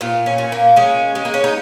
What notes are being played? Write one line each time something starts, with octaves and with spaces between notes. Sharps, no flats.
A#2 F4
C#4
A#2
A#3
G#3 C#4
G#3
A#3
C#4
D#4